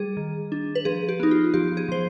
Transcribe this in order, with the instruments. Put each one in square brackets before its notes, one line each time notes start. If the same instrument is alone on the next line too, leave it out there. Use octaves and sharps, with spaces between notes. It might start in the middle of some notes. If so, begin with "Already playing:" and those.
Already playing: [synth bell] G3 G#4
D#3
D4
B4
F3 G#4
G4
B3 D#4
F4
F3 G4
G#4
F3 C5